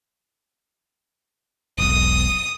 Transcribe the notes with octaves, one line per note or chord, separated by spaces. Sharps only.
E1 B1 D#6